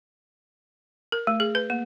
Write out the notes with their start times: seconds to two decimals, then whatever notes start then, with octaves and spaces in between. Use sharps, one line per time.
1.12 A#4
1.27 A3
1.40 G#4
1.55 B4
1.70 A#3